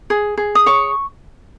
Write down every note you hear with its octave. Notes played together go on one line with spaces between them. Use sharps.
G#4
G#4
D#6
C#5 C#6